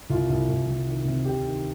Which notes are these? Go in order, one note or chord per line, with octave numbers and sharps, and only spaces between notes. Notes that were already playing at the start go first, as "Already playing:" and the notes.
C2 F4
C2
C2
C2
D#3
C3
D2 G4
D#3